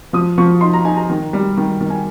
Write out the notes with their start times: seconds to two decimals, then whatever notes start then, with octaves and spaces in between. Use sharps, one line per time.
0.13 F3 D#6
0.38 F3 C#6
0.61 D#4 C6
0.73 A#5
0.85 D#4 G#5
0.97 A#5
1.10 D#3
1.33 G3
1.57 D#3
1.81 D#3
1.90 G#5